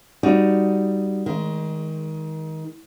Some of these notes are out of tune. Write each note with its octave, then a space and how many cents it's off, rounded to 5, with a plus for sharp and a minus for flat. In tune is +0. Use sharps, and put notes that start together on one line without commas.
G3 +0 D#4 +0 F#4 +0
D#3 +25 G#3 +0